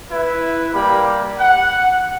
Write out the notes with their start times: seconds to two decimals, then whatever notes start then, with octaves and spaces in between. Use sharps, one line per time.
0.11 E4 B4
0.73 G3 A#3 G4 B5
1.38 F#5